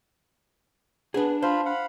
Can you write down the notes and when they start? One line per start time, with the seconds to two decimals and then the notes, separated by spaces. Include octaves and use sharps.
1.14 B3 D4 G#4 B4
1.42 F4 C5 F5 B5
1.66 F5 F#5 B5